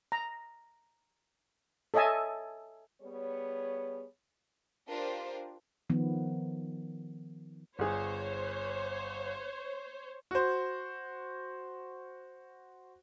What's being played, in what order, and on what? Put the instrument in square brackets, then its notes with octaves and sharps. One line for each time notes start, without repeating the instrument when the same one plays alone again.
[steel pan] A#5
A4 C#5 D#5 E5 G#5 A5
[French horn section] G3 B3 G#4 C#5
[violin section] D4 F4 G4 A#4 C5
[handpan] D#3 F3 B3
[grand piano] G1 G#4 [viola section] C5 C#5
[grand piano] F#4 C5